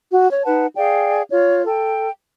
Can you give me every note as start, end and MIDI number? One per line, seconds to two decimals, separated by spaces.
0.11 0.30 66
0.31 0.43 73
0.45 0.67 63
0.45 0.67 71
0.45 0.67 78
0.45 0.67 81
0.76 1.22 68
0.76 1.22 74
0.76 1.22 77
0.76 1.22 79
1.31 1.64 65
1.31 1.64 73
1.66 2.10 69
1.66 2.10 79